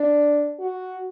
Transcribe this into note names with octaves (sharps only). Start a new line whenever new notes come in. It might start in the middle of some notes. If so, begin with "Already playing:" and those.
Already playing: D4
F#4